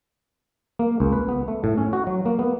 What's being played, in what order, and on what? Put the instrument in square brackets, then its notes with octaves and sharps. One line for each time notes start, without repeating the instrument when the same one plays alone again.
[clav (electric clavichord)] A#3
C#2
B4
B3
A3
A2
C#4
F#4
F#3
A#3
B3